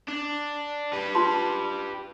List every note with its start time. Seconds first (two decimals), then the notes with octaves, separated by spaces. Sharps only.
0.08 D4
0.93 G4 B4
1.15 F4 A5 C6